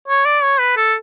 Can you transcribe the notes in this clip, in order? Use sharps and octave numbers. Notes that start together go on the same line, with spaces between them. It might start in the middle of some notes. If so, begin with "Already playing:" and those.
C#5
D5
C#5
B4
A4